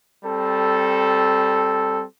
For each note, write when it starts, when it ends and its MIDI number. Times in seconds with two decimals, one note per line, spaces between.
0.24 2.05 55
0.24 2.05 60
0.24 2.05 69